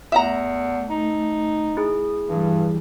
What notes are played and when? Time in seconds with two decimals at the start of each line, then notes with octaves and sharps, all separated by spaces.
0.12 E2 A3 E5 F#5 A#5
0.90 D#4
1.77 E4 G#4
2.28 G2 E3 G3